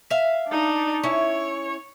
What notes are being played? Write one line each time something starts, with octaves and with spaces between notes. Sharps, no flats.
E5 F5
D4 D#4
C#4 E4 C#5